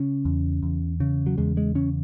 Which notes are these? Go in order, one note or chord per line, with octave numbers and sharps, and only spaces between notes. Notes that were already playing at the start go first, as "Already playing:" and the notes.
Already playing: C#3 C#4
E2
E2
C#3
F#3
E2 G#3
G#3
C#3 C#4